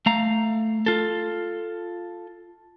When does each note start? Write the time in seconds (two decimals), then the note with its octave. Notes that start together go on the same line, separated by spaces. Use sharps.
0.06 A3 F5 A#5
0.86 F4 A4